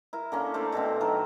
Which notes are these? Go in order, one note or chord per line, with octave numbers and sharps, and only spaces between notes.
E4 A#4
D3 A#3 C#4
A3 A#4 C5 D5
B2 D3 E3 C4
D#3 F#3 A4 A#4